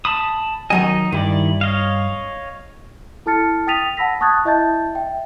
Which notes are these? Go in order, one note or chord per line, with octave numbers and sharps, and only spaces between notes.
A5 B5 D#6
D#3 F#3 D#4 D#5 G#5
G2 D#3 E4 D5
C#5 D#5 F5
E4 A4 A5 F6 A6 C#7
G5 D#6 A6 B6 D#7 F7
F#5 A5 B5 E6 A#6 B6
A5 C#6 D#6 F#6 G#6 A6
E4 D#5 E5 A5 G6 A6
E5 G5